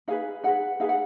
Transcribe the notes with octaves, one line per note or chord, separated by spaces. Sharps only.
D#4 G#4 B4 F5
D#4 G#4 B4 F#5
D#4 G#4 B4 F5
F#5